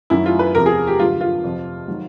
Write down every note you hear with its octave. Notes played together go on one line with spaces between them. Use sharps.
F#2 D#3 F#3 E4
F4
B4
E2 C3 F3 A#4
G#4
G4
G2 D3 F#3 F4
F4
F2 C3 F3
D#3 F#3